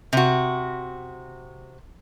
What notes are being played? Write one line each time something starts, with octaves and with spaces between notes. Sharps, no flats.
C3 F#4